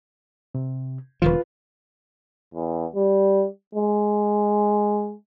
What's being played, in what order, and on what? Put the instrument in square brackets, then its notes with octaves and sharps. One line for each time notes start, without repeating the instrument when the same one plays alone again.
[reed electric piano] C3
[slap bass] E1 D#3 F3 [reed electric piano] F4 B4
[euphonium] E2
G3
G#3